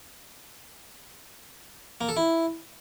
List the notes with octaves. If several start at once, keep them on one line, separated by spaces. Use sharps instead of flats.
A#3
A4
E4